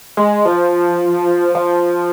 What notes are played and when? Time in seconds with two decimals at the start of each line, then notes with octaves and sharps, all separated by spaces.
0.17 G#3
0.45 F3
1.55 F3